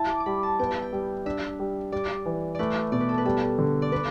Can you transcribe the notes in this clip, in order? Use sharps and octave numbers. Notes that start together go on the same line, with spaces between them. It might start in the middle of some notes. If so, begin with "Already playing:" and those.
Already playing: E4 A5
D6
D6
G3 B5
A5
B3 G5
E5
G5
G3
D4 E5
G3
G3 D5
E3
A3 B4 D5
B2 D5
B4
A4
B4
G3 A4
D3
D5
B3 B4